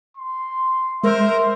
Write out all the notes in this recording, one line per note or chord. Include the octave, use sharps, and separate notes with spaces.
C6
G#3 A#4 C5 E5